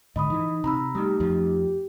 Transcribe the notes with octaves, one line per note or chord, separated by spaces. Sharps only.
G#2 D3 D#5 B5 D#6
E3 D#4
C3 A#5 B5 E6
G3 A3 D#4 G4
F2 F3